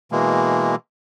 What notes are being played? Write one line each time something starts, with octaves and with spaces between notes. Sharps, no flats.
B2 E3 G#3 A#3